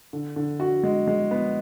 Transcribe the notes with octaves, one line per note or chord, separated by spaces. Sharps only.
D3
D3
F#4
G#3
G#3
B3